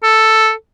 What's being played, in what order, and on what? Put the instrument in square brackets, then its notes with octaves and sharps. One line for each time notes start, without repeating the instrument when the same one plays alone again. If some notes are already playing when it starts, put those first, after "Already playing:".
[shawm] A4